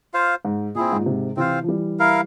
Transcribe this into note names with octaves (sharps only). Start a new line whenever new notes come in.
F4 C5 F5
G#2
A#2 C4 E4 G#4
G#2
A#2
G#2 C3
C3 E3 C4 F4 C5 F5
F3
E3 G3
E4 A#4 F5